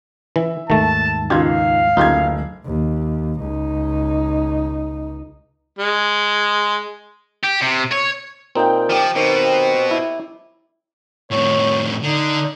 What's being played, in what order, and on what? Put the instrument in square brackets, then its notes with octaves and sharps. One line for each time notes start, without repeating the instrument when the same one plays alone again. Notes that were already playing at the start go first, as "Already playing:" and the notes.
[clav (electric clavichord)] E3 [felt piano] E5
[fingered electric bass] D#2 G#2 [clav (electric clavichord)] D#3 A3 [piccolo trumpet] A5
[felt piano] C#2 D#3 G#6 [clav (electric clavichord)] F4 G4 [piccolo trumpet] F5
[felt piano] F#1 G#6 [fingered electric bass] D2 [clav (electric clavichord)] D#4 F4 G4
[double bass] D#2
C#2 D#4
[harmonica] G#3
[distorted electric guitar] G4
C3
C#5
[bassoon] A#2 [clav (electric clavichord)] C4 D#4 [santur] A#4 G5
[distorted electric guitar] F3 [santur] G4 G5
[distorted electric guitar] B2 [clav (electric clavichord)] D#3 [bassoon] C4
[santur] G5
[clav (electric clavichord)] E4
[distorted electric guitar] F2 A2 [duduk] C#5
[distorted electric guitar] D3 [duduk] D#4